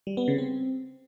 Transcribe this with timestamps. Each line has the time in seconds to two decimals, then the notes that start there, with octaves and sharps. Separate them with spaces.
0.07 G3
0.17 B3
0.28 C#3
0.38 C4